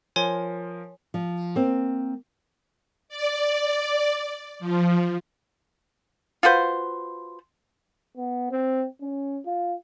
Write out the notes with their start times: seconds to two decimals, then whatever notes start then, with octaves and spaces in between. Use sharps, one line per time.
0.16 F3 A#4 C#5 G#5 C6
1.14 F3
1.56 A#3 C4
3.09 D5
4.59 F3
6.43 F4 F#4 B4 C5
8.17 B3
8.51 C4
9.01 C#4
9.46 F4